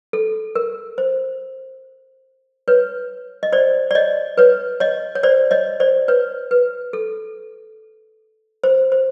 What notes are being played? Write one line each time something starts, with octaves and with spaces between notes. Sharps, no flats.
A4
A#4
C5
B4 C#5
D#5
C5 D5
D5
C#5 D#5
B4 C#5
C#5 D#5
C#5
C5 D5
C#5 D#5
C5 D5
B4 C#5
B4
A4
C5
C5